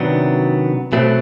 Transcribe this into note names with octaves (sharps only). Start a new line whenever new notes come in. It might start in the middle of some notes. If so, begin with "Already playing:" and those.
Already playing: C3 D#3 F#3 B3 D4
B2 F#3 A3 C4